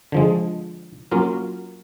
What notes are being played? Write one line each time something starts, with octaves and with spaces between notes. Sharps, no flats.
D3 F3 G#3
F#3 A#3 C#4 F4 A#4